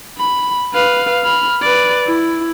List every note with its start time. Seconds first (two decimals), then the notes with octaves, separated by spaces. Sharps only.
0.18 B5
0.74 B4 F5
1.23 B5 F6
1.62 B4 D5
2.07 E4